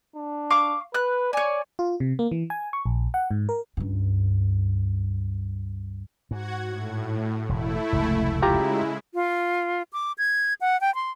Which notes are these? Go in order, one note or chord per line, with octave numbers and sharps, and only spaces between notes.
D4
F5 C#6 D6
B4 F#6
C#5 D5 G#5
F4
C3
A#3
E3
G#5
C#6
A#1
F#5
G#2
A#4
C#2 G2
G#2 F#4 F#5 G#6
A2
E1 A3 E4
F1 C#2 G#2
C#3 G#3 E4 F4 G4 A#5
F4
D6
G#6
F#5
G5
C6